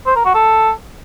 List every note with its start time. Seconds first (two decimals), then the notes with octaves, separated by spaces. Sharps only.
0.06 C5
0.16 A#4
0.25 F#4
0.35 A4